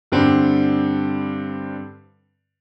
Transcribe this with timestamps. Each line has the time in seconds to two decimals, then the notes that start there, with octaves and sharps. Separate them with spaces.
0.12 G2 D3 G3 C4